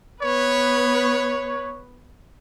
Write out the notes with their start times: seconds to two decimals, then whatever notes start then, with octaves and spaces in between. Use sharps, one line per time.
0.23 B3 B4 C#5